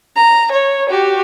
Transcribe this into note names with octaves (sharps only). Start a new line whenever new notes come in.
A#5
C#5
F#4 G4